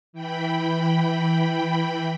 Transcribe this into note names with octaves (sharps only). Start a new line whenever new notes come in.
E3 G5 B5